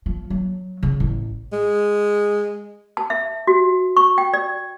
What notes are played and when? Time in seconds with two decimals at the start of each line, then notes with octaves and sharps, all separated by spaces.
0.06 F3
0.30 F#3
0.83 C#3
1.00 A1
1.53 G#3
2.97 A5
3.10 E5
3.47 F#4
3.97 C#6
4.18 G5
4.33 D5